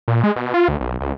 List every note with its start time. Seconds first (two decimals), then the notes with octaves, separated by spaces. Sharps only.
0.08 A#2
0.24 G#3
0.36 B2
0.54 F4
0.68 D2
0.80 B1
1.01 C#2